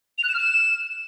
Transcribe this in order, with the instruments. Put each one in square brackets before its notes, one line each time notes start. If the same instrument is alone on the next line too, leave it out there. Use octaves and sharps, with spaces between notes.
[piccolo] F7
F#6
E7
F6
E7